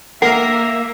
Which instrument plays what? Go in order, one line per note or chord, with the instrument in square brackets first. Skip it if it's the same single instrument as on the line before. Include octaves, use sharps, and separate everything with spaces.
[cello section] A#3 [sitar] A#4 [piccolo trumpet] E5 [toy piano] F#5